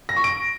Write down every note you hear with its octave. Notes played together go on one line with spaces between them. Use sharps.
A#6
C#6
D7